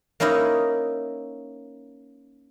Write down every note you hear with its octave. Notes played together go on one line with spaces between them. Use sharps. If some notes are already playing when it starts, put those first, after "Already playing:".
A#3 C#4 D#4 E4 D#5